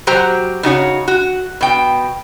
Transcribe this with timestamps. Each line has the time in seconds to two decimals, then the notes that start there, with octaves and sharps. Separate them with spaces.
0.07 F#3 F#4 G4 C5 G5 A#5
0.63 C#3 D#4 F#4 C#5
1.08 F#4
1.61 B2 G5